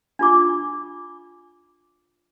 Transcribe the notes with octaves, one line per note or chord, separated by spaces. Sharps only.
D4 F4 D6